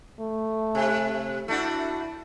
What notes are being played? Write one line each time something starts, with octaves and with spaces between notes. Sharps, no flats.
A3
C3
A3 D4 E4 F#4